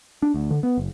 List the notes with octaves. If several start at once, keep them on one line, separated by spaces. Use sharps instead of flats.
D4
D2
D3
B3
F#1